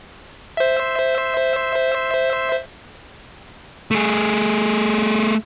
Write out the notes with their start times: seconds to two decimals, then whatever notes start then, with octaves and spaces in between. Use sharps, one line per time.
0.57 C5 E5
3.91 A3 G#4